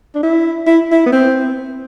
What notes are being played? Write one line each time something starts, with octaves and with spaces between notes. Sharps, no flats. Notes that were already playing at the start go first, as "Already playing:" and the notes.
D4
E4
E4
E4
B3
C4